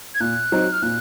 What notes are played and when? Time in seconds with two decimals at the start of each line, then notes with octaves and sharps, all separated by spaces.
0.15 G#6
0.20 A#2 F#6
0.52 F#3 C4 D#4
0.73 F6
0.82 A#2 F#6